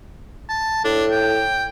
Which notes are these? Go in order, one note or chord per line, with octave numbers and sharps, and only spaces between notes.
A5
A2 D4
G5